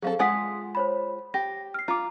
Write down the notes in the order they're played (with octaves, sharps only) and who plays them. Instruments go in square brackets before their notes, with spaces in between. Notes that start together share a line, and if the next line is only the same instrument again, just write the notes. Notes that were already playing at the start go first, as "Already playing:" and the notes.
[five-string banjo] F#3 C4 A4 [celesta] G#4 F5
[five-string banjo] G#3 F4 F#5 [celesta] G#5 D#6 B6
[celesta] C5 C#5 B5
[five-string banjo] G4 [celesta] A#6
[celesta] F6 C7
[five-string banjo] F4 [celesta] A#5 D6